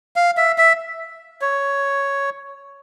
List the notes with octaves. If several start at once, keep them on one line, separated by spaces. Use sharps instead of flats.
F5
E5
E5
C#5